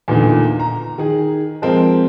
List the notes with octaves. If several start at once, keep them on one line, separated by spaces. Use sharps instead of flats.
E2 A#2 D3 D#3
A#5
D#3 G#4
F3 G#3 C4 A#4